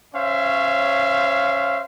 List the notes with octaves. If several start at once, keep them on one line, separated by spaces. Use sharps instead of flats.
C#4 C5 C#5 E5 F5